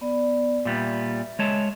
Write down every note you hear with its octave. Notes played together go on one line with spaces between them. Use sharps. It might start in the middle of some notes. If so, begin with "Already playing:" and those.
B3 D5
A#2 G3 B3 E5
G#3 C#5 A5